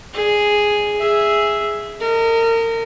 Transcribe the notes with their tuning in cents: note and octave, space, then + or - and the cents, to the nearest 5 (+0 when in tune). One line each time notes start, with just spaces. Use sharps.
G#4 +0 D5 +20
G#4 +0 E5 +0
A#4 -35 D#5 +10